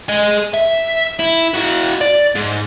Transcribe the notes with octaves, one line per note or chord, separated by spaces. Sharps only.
G#4 D#5
E5
E4
E4 F#4
D5
G#2